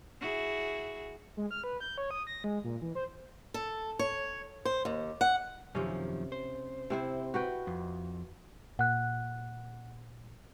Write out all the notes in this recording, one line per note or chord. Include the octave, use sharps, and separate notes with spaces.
E4 F#4 G#4
G#3
F6
B4
G6
C#5
D#6
A#6
G#3
A#2
E3
C5
A4
C#5
C5
D#2
F#5
F#2 C3 D#3 F3 C#4
C5
C3 C4 E4
F#4 B4 G5
F2
A#2 F#5 F#6